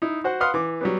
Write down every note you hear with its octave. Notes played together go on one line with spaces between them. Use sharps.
D#4 E4
F#4 C5 F#5
B4 F5 F#5 C6 D#6 F6
E3 D6
F#3 G3 B3